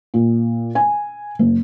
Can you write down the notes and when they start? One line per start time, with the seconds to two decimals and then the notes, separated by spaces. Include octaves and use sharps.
0.14 A#2
0.75 G#5
1.39 F#1